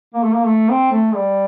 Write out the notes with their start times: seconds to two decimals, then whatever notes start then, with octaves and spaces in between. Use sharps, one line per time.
0.14 A#3
0.23 A3
0.35 A#3
0.46 A3
0.69 C4
0.91 A3
1.14 G3